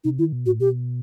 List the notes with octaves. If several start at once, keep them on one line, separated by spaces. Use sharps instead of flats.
C3 D#4
D#3 E4
B2
A2 F#4
B2 G4